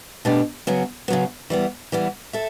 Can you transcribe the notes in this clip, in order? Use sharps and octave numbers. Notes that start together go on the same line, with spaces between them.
B2 A3 D4 G4 D5
C#3 F#3 B3
C#3 F#3 B3
E3 G3 B3
E3 G3 B3
A4 E5